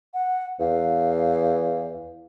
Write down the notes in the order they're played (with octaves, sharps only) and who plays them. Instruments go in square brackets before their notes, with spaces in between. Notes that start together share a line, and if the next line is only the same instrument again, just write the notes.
[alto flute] F#5
[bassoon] E2 [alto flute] F5